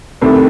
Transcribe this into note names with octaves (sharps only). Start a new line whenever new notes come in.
C2 C3 D#3 A3